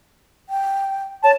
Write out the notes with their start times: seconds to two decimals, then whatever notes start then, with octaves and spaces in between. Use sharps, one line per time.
0.49 G5
1.24 C#5 A5